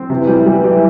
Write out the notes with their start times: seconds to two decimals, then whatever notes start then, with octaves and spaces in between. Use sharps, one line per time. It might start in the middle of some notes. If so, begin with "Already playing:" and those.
Already playing: C4
0.10 C3 E3
0.27 G3
0.46 G3
0.64 G3